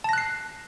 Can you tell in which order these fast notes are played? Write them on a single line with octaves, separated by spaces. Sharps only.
A5 A#6 F#6 C7